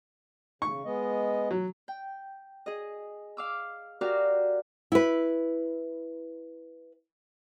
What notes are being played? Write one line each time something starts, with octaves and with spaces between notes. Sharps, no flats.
C#3 C#6
G#3 B3 D#5
F#3
G5
G#4 D#5
F5 D6 E6
F#4 G4 A#4 D5 F5
E4 B4